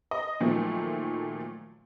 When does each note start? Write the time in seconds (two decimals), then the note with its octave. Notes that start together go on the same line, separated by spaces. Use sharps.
0.11 D#5
0.40 A#2 D#3 F3 F#3 A3